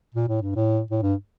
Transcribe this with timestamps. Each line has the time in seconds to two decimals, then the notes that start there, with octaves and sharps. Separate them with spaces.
0.15 A#2
0.28 A2
0.42 G2
0.56 A2
0.91 A2
1.02 G2